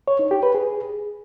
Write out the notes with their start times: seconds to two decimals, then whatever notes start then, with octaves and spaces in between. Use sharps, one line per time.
0.08 C#5
0.19 D#4
0.31 G4
0.43 B4
0.55 G#4